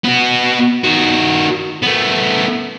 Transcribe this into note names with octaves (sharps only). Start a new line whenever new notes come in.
B3 F#4
D#3 F#4
A3 B3